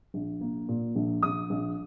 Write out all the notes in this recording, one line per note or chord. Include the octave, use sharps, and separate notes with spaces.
A#1
A#3
A#2
A#1
A#1 D#6
A#1